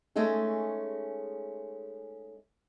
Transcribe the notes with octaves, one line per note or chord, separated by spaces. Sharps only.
G#3 A3 C#4 D#4 G#4